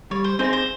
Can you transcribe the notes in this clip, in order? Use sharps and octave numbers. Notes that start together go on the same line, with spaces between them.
G3 C#5
C5
C4 D#4 G#4 C5
C5